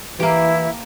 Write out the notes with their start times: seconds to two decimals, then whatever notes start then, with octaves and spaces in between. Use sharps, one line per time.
0.20 E3 A#3 E4 G4